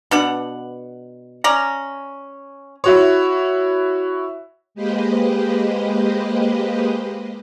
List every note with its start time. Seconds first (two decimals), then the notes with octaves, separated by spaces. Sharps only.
0.11 B2 D4 F#5
1.44 C#4 D5 A#5
2.84 E4 F#4 C#5
4.75 G#3 A#3 G4 B4 C5 D#5